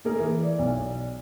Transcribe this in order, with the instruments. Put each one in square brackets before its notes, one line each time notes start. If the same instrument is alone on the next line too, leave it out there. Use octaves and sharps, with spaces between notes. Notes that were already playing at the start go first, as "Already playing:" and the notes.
[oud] A2 [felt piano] A#3 G#4 A#4
[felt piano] E3
[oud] F2 D5
[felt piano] B1